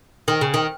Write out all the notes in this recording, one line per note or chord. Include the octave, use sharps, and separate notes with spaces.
D#3
C#3
D#3